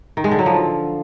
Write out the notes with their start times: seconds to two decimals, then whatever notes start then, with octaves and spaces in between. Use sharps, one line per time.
0.17 D#3
0.24 G#3
0.31 D3
0.39 F#3
0.46 F3